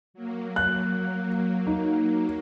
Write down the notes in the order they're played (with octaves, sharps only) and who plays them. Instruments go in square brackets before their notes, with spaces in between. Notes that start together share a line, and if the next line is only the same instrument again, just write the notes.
[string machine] F#3 A#3
[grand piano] F#6
D#4